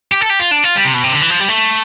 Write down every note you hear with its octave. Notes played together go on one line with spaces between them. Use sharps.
G4
A4
G4
F4
D4
F4
G3
C3
B2
C3
D3
E3
F3
G3
A3